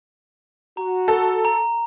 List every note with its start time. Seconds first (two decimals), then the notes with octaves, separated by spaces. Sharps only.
0.77 F#4 A#5
1.08 A4
1.45 A#5